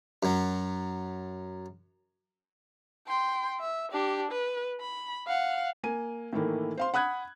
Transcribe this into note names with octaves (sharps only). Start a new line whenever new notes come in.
F#2 F#3
G5 C6
E5
D4 G4
B4
B5
F5 F#5
A#3 G#5 D#7
A2 D#3 E3 A3 A#3
C5 F5 C6
F#5 B5 D#6 F#6 G#6